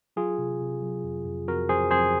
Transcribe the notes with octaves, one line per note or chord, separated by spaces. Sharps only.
F#3 F4 G#4
C3
C3
F#3
F2
F2
F2 F#4 A#4
F2 G#4 C5
F2 G#4 C5